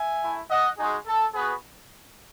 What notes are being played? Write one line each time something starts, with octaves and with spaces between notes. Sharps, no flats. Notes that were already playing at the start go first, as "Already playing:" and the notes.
Already playing: E5 G#5
A3 E4
D#5 F#5
G#3 D#4 F#4 G#4
A4
B3 F#4 G#4 B4